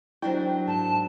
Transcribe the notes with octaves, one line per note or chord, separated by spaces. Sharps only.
F#3 D4 E4 A#4 C5 G5
G#2 A5